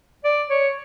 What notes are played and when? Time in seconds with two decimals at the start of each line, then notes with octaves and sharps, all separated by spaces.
0.24 D5
0.50 C#5